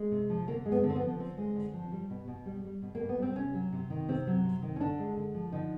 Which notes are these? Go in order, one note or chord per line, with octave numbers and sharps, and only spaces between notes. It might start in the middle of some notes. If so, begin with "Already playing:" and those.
Already playing: G#3
C3
F3
D3 A#3
G#3
B3
D3
C4
B3
F3
D3 C4
G#3
D3
F3
G3
B2
B2
G3
G3
B2
A#3
B2
B3
G3 C4
C3 C#4
F#3
C3
D#3
C3 C4
F#3
C3
D#3
C#4
D3 D4
G#3
D3
F3
D3 D#4